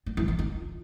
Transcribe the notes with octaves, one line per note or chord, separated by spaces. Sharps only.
B3
E3
E3
F4